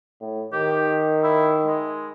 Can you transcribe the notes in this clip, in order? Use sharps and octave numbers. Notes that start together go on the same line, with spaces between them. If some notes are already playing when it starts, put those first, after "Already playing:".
A2
D#3 G4
E4
G#3